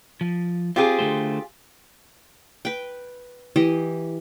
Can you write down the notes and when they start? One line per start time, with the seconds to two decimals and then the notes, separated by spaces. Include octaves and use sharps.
0.21 F3
0.76 C4 F4 G4 G#4
0.99 D3 A3 C5
2.65 B4 G5
3.56 E3 G4 D#5